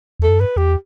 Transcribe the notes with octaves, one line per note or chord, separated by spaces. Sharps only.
E2 A4
F#2
G2 B4
E2 G4